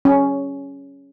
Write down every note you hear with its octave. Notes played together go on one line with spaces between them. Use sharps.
C#4